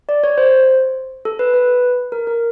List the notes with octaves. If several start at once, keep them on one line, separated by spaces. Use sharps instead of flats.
D5
C#5
C5
A4
B4
B4
A#4
A#4